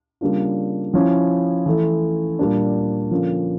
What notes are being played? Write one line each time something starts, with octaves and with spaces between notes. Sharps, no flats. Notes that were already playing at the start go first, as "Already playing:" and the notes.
C#3 G3 A#3 D4 F4
F3 C#4 E4
E3 A3 E4
A#2 G3 A#3 D4
D3 F3 A#3 C#4 F4